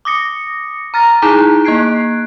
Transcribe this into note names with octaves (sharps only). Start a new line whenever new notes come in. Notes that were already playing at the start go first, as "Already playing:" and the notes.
D6 D#6 A#6 C#7
A#5 F6 A6 A#6
D#4 E4 G#4 A5 A#5 D6
A#3 F#6 G#6 C7 D7